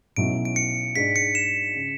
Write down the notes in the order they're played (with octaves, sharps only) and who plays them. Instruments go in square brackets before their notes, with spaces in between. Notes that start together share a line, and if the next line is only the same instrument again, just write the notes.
[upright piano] B1 B2 F#3 C#4 E4 [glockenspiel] D7
[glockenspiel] D7
C#7
[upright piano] G#2 G#3 D4 [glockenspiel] B6
[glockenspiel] C#7
E7
[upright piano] C#3